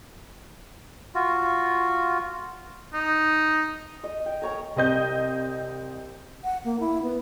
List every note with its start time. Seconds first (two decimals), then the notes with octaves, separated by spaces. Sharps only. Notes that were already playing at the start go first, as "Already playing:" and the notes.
1.15 F4 F#4
2.93 D#4
4.04 D#5
4.26 G5
4.42 A#4 C#5 A#5
4.76 C2 C4 D#5 G6
6.44 F#5
6.65 A#3
6.80 E4
7.03 B3